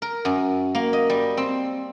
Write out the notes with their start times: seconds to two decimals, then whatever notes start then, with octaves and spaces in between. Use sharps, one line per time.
0.02 A#4
0.25 F#2
0.75 A#3
0.93 D#5
1.10 G3
1.37 C4